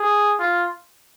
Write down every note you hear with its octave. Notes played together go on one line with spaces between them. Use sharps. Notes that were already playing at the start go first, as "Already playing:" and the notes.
Already playing: G#4
F4